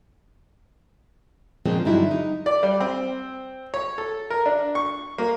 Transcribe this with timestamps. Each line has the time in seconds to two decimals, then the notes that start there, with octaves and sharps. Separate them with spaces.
1.65 F#2 A#2 D3 F3 G#3 C4
1.85 G2 D3 F#3 G#3 D#4 E4
2.11 D#4
2.46 D5
2.63 G3
2.80 C4
3.74 C#5
3.98 A4
4.30 A#4
4.46 D4
4.75 C#6
5.18 A#3